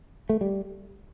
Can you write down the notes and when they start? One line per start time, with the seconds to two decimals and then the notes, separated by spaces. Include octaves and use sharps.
0.29 A3
0.41 G3